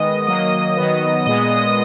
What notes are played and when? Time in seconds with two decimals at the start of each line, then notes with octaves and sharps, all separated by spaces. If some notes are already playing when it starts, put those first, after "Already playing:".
Already playing: D#3 G#3 B3 D#5 D#6
0.26 D#3 F#3 A#3 D#5 D#6
0.77 D#3 F#3 B3
1.26 A#2 G#3 B3 D#5 D#6